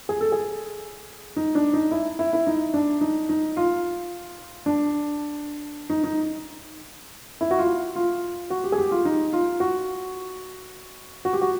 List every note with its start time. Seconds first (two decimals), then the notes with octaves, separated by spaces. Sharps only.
0.09 G#4
0.21 A4
0.32 G#4
1.36 D#4
1.55 D4
1.73 D#4
1.91 E4
2.19 E4
2.33 E4
2.47 D#4
2.74 D4
3.01 D#4
3.29 D#4
3.57 F4
4.66 D4
5.90 D#4
6.04 D#4
7.41 E4
7.51 F#4
7.59 F4
7.96 F4
8.50 F#4
8.64 G4
8.72 G#4
8.78 G4
8.91 F4
9.05 D#4
9.33 F4
9.60 F#4
11.25 F#4
11.33 G4
11.41 F#4